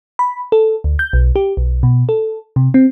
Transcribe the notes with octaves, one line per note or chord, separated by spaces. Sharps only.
B5
A4
D2
G6
B1
G4
B1
B2
A4
C3
C4